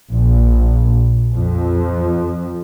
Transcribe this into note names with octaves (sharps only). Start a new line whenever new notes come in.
A#1
F2